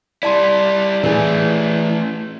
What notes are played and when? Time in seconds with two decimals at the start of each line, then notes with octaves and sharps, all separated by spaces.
0.23 G3 E4 D5 A5 C6
1.03 E3 A3 C#4 G#4